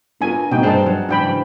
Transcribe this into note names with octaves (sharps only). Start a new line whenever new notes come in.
B3 D4 F4 A#4 G#5
B2 A#3 C4 D#4 G5
G2 D4 G#4 C5 A5
F#3
G#2 C#3 E3 D4 G5 B5